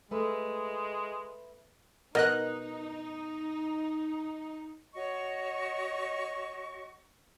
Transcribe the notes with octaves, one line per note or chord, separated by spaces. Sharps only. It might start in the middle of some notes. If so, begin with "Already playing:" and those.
G#3 A3 B4
B2 D#4 A#4 D#5 F#6
F#4 C#5 D#5 C#6